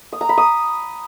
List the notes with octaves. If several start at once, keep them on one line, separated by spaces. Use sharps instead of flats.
D#6
A#5
B5
D#6